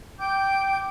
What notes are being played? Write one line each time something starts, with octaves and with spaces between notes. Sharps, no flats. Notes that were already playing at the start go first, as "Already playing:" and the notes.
G5 D6 G6